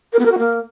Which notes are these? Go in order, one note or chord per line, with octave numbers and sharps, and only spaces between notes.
A#4
B3
A#4
F#4
A#3